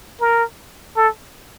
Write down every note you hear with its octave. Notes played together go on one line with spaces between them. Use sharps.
A#4
A4